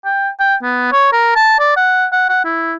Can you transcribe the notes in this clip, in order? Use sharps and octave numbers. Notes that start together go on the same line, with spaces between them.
G5
G5
B3
C#5
A#4
A5
D5
F#5
F#5
F#5
E4